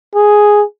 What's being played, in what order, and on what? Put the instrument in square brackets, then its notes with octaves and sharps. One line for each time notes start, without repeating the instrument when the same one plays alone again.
[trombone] G#4